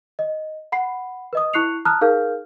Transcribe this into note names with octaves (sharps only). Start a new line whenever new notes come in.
D#5
F#5 B5 C7
B4 D#5 D#6
E4 C#6 F#6 C7 C#7 F7
A5 A#5 D#6 F6 F#6
D#4 G#4 A#4 F5 F6 G6